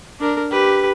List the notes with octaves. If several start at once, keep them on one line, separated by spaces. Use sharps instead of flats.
D4 A#4
G4 B4